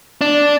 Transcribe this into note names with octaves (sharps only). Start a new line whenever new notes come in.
D4